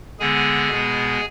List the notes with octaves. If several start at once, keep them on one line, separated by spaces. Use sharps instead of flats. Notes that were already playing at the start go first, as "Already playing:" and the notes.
D3 G#3 B3 G#4 G#5
B2 G#3 B3